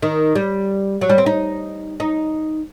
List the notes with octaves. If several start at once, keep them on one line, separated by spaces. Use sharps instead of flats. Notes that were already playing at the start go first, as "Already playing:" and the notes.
D#3
G3
F#3
G3
C4
D#4
D#4